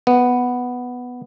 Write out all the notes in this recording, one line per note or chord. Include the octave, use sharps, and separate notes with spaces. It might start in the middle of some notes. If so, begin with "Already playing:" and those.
B3